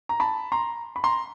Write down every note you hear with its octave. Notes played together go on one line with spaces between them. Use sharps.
A#5
A5 B5
A#5 C6
B5
A#5 C6